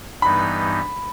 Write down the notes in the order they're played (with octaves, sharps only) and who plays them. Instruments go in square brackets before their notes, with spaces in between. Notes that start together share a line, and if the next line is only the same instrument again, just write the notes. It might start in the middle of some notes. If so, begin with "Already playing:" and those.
[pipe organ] G2 E3 G3 B3 D#4 [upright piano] B5